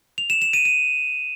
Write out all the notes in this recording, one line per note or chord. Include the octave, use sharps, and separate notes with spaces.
F7
E7
E7
D#7
D#7